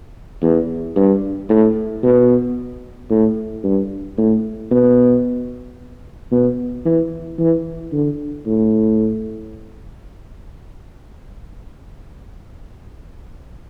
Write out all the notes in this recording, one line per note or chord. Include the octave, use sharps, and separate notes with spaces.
E2
G2
A2
B2
A2
G2
A2
B2
B2
E3
E3
D3
A2